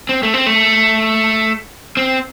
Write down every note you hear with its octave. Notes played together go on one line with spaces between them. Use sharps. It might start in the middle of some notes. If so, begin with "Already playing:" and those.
C4
A3
C4
A3
C4